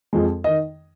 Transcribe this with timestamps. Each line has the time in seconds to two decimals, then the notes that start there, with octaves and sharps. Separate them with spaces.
0.13 F2 F3 G#3
0.44 D#3 D#5